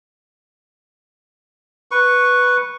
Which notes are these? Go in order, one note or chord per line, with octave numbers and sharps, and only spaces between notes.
B4 C#6